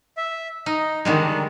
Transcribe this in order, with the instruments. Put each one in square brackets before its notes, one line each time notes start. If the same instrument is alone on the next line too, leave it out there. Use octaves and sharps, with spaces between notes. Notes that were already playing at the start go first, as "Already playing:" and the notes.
[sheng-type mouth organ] E5
[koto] D#4 [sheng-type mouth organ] D#5
[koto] D3 G3 G#3 [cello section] D#3 [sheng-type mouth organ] D4